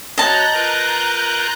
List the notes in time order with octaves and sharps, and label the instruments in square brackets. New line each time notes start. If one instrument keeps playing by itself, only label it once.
[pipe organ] F#4 C#5 [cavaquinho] D#5 A5 [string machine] A#5 F#6 G6
[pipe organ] F4 A#4 B4